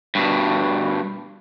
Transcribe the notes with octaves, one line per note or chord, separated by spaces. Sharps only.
G2 B2